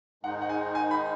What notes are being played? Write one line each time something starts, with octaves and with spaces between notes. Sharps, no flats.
G#2 D#3 G#3 D#4 F#5
F#5
G#5
G#5
B5